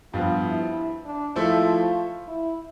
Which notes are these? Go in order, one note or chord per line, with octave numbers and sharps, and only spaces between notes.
G2 F3 B3 F4
E4
D4
F3 A3 E4 F4 A4 C5
E4